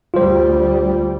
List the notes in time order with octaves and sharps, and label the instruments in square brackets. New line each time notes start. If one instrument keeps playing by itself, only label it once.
[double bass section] D2 G3 [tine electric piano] F4 C5